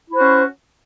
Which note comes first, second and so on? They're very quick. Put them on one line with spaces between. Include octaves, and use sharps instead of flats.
E4 C5 F#4 C#4